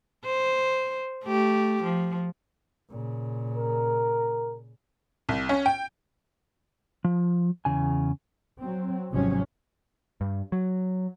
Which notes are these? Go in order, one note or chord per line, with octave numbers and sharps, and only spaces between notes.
C5
A3 G4
F3
A#2 C#3
A#4
C2
C#4
G5
F3
E2 C#3 G#5
F#3 C4
G#1 C3 F3 F#3 C#4
G2
F#3